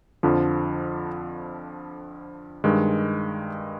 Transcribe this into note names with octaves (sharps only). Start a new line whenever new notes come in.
F2 D3 F3
G2 D#3 G#3